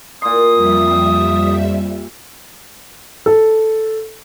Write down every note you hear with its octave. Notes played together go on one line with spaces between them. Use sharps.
A#2 C6 D#6
F2 G3 E5
A4